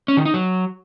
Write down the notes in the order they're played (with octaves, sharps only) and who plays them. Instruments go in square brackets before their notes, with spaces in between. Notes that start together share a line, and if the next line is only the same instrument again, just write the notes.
[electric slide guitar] C#4
D#3
D#4
F#3